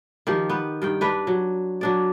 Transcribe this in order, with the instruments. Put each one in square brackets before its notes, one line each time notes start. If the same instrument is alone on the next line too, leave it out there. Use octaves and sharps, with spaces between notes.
[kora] D#3 F3 G4
B3
G2 D#3 G5
D4 B4
F#3
F#3 D4 D5